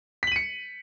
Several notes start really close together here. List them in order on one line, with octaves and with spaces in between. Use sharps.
B6 F#7 D#7 C#7